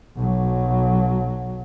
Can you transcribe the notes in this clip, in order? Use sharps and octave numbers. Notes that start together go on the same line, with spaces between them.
B1 F#3